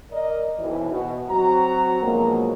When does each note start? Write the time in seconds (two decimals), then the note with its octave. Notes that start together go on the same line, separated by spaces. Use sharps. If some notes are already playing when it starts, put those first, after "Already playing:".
0.11 A#4 D5 D#5
0.59 B1 E3 C4
0.90 B2
1.30 F#3 C4 F#4 A#5
2.02 B2 D3 F3 F#3 G#3 A#3